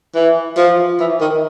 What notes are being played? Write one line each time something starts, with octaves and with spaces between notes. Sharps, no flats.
E3
F3
E3
D#3